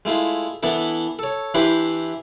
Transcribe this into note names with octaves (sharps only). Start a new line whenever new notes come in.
G#3 A3 E4 F4
E3 B3 D4 E4 A4
A4 C#5
E3 D4 E4 G4 B4 C5